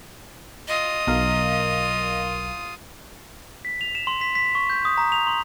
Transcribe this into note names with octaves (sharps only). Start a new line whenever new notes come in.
F4 D#5 D#6
B1 A#4 F5
B6
F7
E7
C6
B6
B6
C#6
G6
D#6
A#5
F7
C6